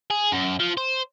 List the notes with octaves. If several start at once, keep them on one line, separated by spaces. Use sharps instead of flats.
G#4
F#2
F3
C5